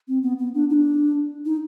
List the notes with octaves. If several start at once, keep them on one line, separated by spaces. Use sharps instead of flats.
C4
B3
B3
D4
D#4
D4
D#4